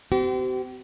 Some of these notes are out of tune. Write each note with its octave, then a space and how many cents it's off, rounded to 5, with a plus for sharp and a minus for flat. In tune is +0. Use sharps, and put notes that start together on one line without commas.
C4 -35 G4 -45